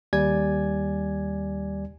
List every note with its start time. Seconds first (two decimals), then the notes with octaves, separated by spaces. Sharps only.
0.13 D#2 G3 D5 G#5 G#6